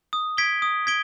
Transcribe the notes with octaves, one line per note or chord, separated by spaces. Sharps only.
D#6
G#6 B6 D7 G7
D#6
G#6 B6 D7 G7